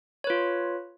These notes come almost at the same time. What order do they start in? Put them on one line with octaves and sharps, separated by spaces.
C#5 B4 F4